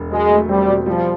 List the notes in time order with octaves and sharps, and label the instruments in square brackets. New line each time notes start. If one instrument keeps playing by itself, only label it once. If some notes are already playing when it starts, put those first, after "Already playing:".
Already playing: [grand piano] E1
[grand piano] F#3 [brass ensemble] G#3
[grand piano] A3
[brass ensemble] G3 [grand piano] C4
[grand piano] B2
[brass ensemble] F3 [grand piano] G3